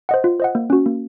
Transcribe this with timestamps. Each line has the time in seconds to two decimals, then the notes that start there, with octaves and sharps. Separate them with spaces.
0.09 C5 D#5 F#5
0.24 F4
0.40 C5 D#5 F#5
0.55 A#3
0.70 C#4 F#4
0.86 A#3